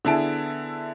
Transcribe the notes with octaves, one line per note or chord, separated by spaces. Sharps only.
D3 B3 E4 G#4 A5 D7